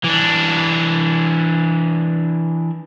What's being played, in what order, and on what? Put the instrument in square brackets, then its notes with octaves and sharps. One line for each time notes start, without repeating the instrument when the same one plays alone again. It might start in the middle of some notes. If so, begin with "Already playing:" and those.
[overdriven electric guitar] E3 D4